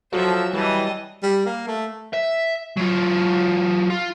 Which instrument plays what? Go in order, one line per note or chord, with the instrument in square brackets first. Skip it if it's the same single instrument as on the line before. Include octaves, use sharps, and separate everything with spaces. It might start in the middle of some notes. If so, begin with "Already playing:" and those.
[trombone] F3 [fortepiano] F#3 [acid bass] A4 [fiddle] C5 E5
[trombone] E3 [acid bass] G3 [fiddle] D#5 A5
[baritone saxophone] G3
A#3
A3
[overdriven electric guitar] E5
F#3 F4
F4